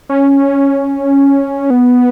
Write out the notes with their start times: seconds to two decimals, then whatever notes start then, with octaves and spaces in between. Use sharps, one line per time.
0.10 C#4
1.70 B3